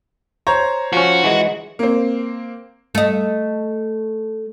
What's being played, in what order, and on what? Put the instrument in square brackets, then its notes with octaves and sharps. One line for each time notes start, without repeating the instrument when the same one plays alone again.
[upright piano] C5 C#5 A#5
[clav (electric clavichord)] F3 C#4 [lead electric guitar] F#4
[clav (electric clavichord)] E3 G#3
[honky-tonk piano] A#3 C4
[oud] A3 D#5